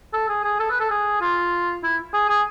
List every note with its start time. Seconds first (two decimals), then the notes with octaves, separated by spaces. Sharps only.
0.13 A4
0.29 G#4
0.44 G#4
0.59 A4
0.70 B4
0.80 A4
0.90 G#4
1.21 F4
1.83 E4
2.13 G#4
2.29 G#4